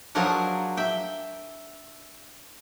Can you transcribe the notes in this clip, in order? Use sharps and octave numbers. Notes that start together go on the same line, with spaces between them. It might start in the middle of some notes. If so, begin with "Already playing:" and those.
F3 F#3 D4 G#4 A#4 F#5
E5 G5